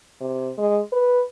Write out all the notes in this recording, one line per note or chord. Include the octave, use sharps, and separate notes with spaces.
C3
G#3
B4